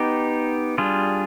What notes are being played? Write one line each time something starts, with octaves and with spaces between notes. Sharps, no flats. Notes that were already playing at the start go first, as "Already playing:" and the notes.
Already playing: B3 D#4 G4
G3 D4 F4 G#4